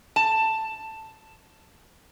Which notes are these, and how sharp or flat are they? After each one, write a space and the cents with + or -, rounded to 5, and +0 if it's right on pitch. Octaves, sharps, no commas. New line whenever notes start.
A5 +5